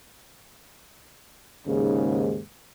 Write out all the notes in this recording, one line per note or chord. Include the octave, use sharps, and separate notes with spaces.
D#2 G#2 C#3